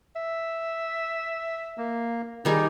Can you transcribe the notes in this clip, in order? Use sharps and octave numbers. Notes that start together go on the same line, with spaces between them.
E5
A#3
D#3 G3 D#4 G#4